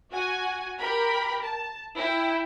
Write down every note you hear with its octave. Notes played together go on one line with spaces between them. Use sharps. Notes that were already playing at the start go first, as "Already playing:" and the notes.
F#4 G#5
G4 A#4 B5
A5
E4 G5